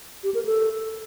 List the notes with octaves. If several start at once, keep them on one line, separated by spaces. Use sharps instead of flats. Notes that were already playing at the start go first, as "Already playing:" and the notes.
G4
A#4
A4